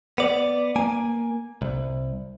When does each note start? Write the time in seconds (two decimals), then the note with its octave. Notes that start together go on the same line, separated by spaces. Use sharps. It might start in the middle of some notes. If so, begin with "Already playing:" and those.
0.18 B3 D5
0.76 A#3 G#5
1.62 C2